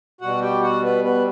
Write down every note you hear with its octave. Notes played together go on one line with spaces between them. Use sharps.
B2 G3 F#4 F#5
G4 G5
F#4 F#5
B3 B4
B3 B4